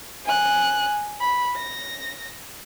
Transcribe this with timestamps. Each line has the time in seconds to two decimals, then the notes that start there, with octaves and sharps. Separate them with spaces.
0.24 G#5 F#6
1.20 B5
1.56 A#6